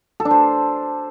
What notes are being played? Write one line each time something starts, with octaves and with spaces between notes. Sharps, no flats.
A4
D4
C5